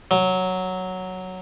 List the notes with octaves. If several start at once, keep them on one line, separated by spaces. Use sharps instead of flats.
F#3